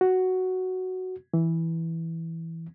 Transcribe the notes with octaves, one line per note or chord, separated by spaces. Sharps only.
F#4
E3